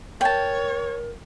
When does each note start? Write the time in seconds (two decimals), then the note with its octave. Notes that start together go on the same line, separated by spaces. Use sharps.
0.21 A#4 C#5 G5 A5